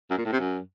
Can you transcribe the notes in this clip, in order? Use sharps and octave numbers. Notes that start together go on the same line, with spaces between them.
F#2
A#2
A2
C3
F#2